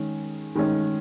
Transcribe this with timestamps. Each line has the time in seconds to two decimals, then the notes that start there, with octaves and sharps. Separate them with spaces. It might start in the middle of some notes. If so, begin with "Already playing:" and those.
Already playing: D#3 G#3 C#4
0.55 D#3 G#3 C#4